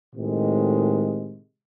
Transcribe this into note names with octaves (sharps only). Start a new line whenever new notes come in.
A2 C3 D#3 G#3